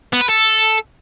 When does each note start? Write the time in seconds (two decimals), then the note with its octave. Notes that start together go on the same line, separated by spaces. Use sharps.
0.13 B3
0.21 B4
0.29 A4